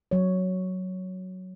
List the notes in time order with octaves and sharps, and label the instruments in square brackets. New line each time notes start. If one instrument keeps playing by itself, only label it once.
[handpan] F#3 C#5